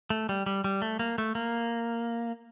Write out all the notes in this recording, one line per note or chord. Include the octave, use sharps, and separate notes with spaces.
A3
G3
G3
G3
A3
A#3
A3
A#3